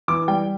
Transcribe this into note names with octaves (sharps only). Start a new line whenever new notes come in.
E3 D6
G3 G5